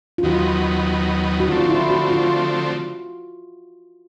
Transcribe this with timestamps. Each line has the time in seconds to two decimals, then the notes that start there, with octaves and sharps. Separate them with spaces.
0.18 F4
0.23 D#2 D#3 F#3 B3 F#4
1.40 F#4
1.48 D3 F3 A3 C4 F4
1.59 F4
1.69 E4
1.90 F#4
2.10 F4